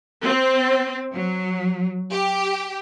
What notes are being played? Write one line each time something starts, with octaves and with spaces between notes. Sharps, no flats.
C4
F#3
G4